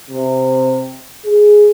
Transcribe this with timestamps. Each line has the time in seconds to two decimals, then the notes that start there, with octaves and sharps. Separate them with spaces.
0.11 C3
1.26 G#4